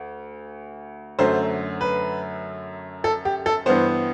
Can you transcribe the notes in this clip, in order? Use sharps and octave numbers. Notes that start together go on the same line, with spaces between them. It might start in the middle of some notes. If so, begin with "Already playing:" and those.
Already playing: D2
F#2 D3 F#3 A3 C5
B4
A4
G4
A4
G2 E3 B3 C5